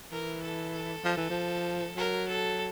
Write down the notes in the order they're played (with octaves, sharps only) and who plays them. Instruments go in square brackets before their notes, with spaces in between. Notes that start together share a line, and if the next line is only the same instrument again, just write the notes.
[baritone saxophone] E3 [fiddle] A#4
[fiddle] A4
A4
[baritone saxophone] F3
E3
F3
[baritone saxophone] F#3 [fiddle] A#4
[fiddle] A4